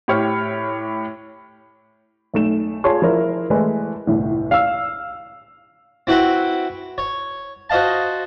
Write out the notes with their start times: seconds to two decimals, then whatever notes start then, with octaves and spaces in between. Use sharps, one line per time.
0.08 A2 G4 C#5 G5 F6
2.34 B1 A3 E7
2.84 F4 G#4 C#5 A5 C6
3.02 F3 E4 A#4 C5
3.50 E3 G#3 A3 E4 B4
4.07 G1 C2 A2
4.51 F5 E6
6.07 C4 E4 F#4 B4 G5 B5
6.98 C#5
7.70 F#4 C5 D#5 F5 A5